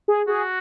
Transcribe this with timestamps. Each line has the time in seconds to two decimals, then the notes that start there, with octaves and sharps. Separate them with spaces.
0.08 G#4
0.28 F#4 G#4